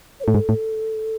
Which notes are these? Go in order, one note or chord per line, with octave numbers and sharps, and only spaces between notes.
C#5
A2 A4
G#2
A2